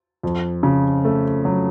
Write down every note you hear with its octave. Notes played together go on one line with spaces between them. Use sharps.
F2
C#3
A3
F#3